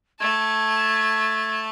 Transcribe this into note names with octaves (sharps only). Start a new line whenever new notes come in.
A3 A5 G#6